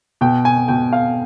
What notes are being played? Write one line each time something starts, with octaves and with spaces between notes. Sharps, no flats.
B2 G5
G#5
B2 G5
F5